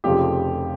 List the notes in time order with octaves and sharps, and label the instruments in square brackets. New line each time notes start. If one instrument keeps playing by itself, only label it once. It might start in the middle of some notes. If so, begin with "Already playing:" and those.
[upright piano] F1 F2 C#3 F3 G4